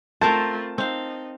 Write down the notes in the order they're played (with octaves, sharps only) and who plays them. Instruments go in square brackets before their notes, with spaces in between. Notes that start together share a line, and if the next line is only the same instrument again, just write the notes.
[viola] A3 F4 [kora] C4 A#4 C5 [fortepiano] A5
[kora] C4 F5 [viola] D#4